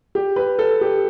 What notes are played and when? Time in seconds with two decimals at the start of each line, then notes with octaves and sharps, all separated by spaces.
0.15 G4
0.36 B4
0.59 A4
0.81 G4